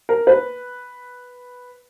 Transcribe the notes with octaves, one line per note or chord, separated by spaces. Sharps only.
A#4
B4